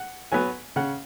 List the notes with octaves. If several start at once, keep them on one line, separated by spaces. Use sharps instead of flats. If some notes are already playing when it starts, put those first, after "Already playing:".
Already playing: F#5
F#3 B3 G#5
C#3 F#5